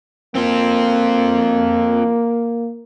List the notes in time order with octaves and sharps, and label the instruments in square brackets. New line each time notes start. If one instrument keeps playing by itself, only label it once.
[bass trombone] A#3 [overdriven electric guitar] C4 F4